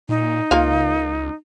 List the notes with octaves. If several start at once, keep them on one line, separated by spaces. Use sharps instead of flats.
A#2 D#4
C#2 A#3 F4 F5